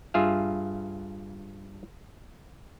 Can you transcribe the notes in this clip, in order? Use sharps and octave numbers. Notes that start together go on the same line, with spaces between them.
G2 F4 G#4 E5 F5